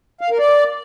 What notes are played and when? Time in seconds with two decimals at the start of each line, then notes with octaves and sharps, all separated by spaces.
0.21 F5
0.30 A#4
0.39 D5